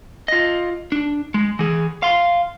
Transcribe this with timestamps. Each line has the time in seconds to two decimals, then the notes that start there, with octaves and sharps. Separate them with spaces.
0.28 F4 D#5
0.92 D4
1.34 G#3
1.59 E3 G#4
2.03 F5 C6